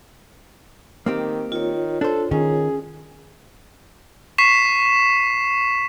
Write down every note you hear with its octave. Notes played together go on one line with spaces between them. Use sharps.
D#3 A#3 C4 G4
D#3 F4 C#5
D4 A4 C5
D#3 C#4 G#4
C#6 B6 C7 E7